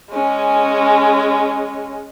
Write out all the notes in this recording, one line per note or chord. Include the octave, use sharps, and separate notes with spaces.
G#3 C#4